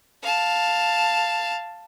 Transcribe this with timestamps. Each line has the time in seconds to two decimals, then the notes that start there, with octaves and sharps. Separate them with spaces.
0.23 F5 A5